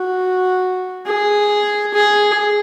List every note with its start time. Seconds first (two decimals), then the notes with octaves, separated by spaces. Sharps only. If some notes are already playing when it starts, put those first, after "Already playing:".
Already playing: F#4
1.06 G#4
1.94 G#4